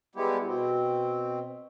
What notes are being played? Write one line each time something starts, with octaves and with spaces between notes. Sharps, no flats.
G3 G#3 B3 E4 G4
B2 C4